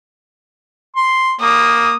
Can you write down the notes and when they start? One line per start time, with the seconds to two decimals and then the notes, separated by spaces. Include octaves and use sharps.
0.96 C6
1.41 A#3 D#6